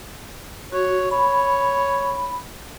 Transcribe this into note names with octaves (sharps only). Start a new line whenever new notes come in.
F#4 C#5
C#5 B5